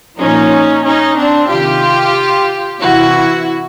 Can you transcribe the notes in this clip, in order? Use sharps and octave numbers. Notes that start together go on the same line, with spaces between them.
A#2 F3 C#4 D#4
C#4 D#4
C4 D4
C3 D#3 F4 G4
C3 E3 E4 F#4